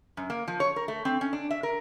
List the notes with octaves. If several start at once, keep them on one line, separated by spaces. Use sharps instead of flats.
F#2
A#3
F3
C#5
A#4
A3
C4
C#4
D4
E5
A#4